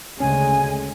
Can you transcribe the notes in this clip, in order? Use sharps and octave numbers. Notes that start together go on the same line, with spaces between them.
D2 C#3 G#3 C#4 G#5